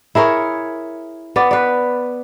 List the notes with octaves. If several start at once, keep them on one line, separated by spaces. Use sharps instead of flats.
E4 G#4 A#4 C#5
B3 D5
B4 D5